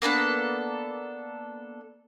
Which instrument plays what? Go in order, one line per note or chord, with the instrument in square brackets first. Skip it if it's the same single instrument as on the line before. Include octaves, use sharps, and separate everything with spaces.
[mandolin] A#3 B3 D4 A4